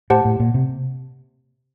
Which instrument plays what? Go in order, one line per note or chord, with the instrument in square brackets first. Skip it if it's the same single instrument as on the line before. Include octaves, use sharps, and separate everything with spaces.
[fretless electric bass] A2 [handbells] G4 C5 F#5 A5
[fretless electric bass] A2
A#2
C3